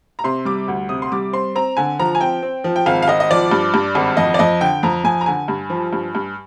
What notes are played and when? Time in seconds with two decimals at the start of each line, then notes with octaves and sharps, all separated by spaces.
0.19 A#5
0.24 C3 C6
0.45 G3 D6
0.68 D2
0.89 C3 D#6
1.02 C6
1.12 G3 D6
1.33 C4 C6
1.55 C4 A#5
1.77 D3 G#5
1.99 F3 A#5
2.15 G#5
2.21 C4 G5
2.43 C4
2.64 F3
2.76 G5
2.86 G#1 F5
3.02 F5
3.08 G#1 D#5
3.20 D#5
3.31 F3 D5
3.51 G2
3.74 G2
3.95 G#1
4.17 F2 D#5
4.34 D5
4.39 F2 D#5
4.61 D3 G5
4.83 F2 A#5
5.04 F2 G#5
5.21 A#5
5.26 D3 G#5
5.48 G2
5.70 F3
5.93 G2
6.15 G2